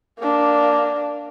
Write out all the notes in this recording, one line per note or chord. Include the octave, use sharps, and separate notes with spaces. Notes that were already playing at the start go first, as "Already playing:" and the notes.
A#3 D4